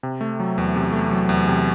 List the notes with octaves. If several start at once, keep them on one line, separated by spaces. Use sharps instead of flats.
C3
A3
F#3
E2
C3
A3
F#3
E2
C3